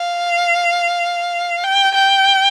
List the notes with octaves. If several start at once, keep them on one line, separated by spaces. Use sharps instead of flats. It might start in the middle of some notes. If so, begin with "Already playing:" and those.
Already playing: F5
G5
G5